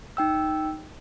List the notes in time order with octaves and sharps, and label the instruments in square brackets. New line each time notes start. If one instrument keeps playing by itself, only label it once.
[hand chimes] D#4 G5 E6